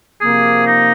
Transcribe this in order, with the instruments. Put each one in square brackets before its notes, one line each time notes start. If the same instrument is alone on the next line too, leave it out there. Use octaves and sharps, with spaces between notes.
[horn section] C3 F3 A#3 [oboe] G#4
[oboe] D#4